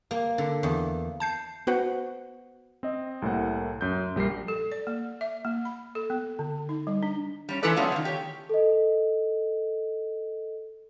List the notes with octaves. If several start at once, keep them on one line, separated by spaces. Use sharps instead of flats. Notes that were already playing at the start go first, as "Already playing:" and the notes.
A#3
D3
E2
A5 G6 C7
B3 F#4 B4 C5 F#5
C4 D#5
C2 A2 A#3 F#5
F#2 G6
A#1 G3 A#4 C7
A4
D5
A#3
E5
A#3
B5
A4
B3
D3
D#4
G3
D4
G3 C#4
E3 G#3 E4 A4 B4 D5
F#3 A3 B3 C#4 F4
C3 D#3
G4 C#5
A4 D#5